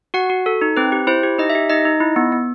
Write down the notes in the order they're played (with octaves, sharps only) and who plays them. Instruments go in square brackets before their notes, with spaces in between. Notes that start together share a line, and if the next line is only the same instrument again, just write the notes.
[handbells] F#4 F#5
F#4
A4
D#4
C4 B4
G4
E4 C5
G4
D#4 D#5
E5
G4
D#4 D#5
D#4
E4
B3
B3